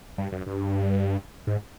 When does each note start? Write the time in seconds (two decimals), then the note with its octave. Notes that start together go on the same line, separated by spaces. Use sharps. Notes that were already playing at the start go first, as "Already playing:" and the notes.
0.18 G2
0.32 F#2
0.47 G2
1.47 G#2